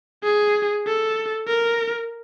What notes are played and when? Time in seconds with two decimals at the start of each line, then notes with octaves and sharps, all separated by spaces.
0.24 G#4
0.86 A4
1.47 A#4